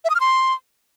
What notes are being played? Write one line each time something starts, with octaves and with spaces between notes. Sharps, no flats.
E5
D#6
F6
C6